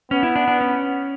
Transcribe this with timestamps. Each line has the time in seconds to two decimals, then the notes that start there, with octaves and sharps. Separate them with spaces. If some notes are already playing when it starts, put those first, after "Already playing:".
0.11 B3 C#4
0.23 E4
0.36 D4
0.48 D4
0.61 C#4